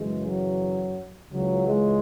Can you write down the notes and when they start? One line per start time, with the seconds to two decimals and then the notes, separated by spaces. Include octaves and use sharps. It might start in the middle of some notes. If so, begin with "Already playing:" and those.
Already playing: F#2 C#3 E3 G#3
0.25 F#3
1.31 C#2 C#3 E3 F#3
1.66 G#3